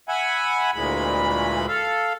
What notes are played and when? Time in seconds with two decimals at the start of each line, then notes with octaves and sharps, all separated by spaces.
0.09 E5 F#5 G#5 B5
0.74 D2 A#2 E3 G#3 B5
1.68 A4 F5